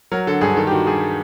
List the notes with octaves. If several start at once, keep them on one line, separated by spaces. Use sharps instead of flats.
F#3 A#4
D3 A4
G2 G#4
D#3 A4
G4
D#3 F#4
G3 G#4